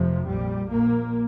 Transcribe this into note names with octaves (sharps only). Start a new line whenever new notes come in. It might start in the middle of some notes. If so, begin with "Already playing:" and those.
Already playing: F1 F2 C3 F3
A#1 A#2 G3
A#1 A#2 A#3